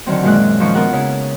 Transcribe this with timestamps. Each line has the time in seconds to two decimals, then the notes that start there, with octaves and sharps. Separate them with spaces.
0.06 D3 D#3 F#3 C4
0.23 F#2 A#2 G#3 F#6
0.60 D#3 F3 C#4 C#6
0.75 B3 F4 A#4 F#5
0.93 C#3 E4